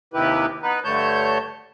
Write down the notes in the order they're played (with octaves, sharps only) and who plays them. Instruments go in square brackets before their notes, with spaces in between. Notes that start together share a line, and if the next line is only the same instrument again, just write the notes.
[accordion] D#2 C3 D#3 E4 G4 B4
B3 D#4 B4
G2 D3 A3 C#5 A5 G6